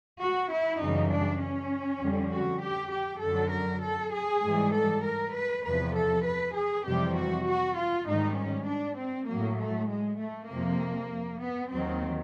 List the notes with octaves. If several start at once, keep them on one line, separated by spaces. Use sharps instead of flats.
F#4
E4
F#2 C#3 E3 G3 D#4
D4
C#4
F2 D3 G3
F#4
G4
G4
F#2 D3 F#3 A4
A#4
A4
G#4
G#2 E3 G3
A4
A#4
B4
E2 C3 F3 B4
A4
B4
G#4
F2 C3 E3 G3 G4
F#4
F#4
F4
G#2 D#3 G3 D#4
C#4
D4
C4
A2 F#3 A#3
A3
G#3
A3
F2 C3 F3 A#3
B3
D#2 D#3 F#3 C4